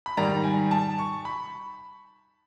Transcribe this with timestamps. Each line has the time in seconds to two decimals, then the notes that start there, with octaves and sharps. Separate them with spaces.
0.06 B5
0.17 G#2 D#3 G3 A#5
0.44 G#5
0.71 A5
0.98 C#6
1.25 B5